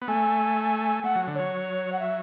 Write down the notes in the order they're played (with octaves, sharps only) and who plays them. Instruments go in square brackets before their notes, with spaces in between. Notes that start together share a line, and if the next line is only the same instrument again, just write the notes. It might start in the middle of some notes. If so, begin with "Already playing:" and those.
[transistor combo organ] B3
[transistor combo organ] A3 [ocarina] G#5
[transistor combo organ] A3 [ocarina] F#5
[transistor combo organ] F#3
D3
[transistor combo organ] F#3 [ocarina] C#5
[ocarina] F#5
E5